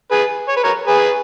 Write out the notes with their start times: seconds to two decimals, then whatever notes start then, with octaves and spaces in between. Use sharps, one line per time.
0.12 G#4 B4
0.49 C#5
0.57 B4
0.64 A#4 C#5
0.87 G#4 B4